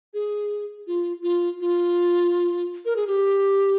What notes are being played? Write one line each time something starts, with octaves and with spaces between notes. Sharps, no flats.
G#4
F4
F4
F4
A#4
G#4
G4